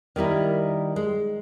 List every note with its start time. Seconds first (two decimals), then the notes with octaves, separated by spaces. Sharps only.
0.16 D#3 G3 E4 A#4
0.96 G#3